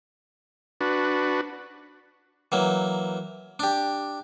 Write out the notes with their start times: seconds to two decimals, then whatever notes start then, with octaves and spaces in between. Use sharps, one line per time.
0.81 D4 F#4 B4
2.52 E3 F#3 A#3
3.59 D4 G4